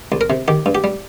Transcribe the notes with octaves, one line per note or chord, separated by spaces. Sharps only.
C2
A#4
C3
D#3 G4
G2
G4
G3